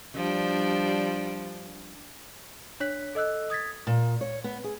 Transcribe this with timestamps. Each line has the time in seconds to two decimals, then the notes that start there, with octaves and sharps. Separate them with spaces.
0.15 F3 G3 D4
2.80 D4 C#5 F#6 B6
3.15 A4 D#5 E6 F#6
3.50 D#6 G#6 A6 B6
3.87 A#2
4.21 C#5
4.44 B3
4.64 G#4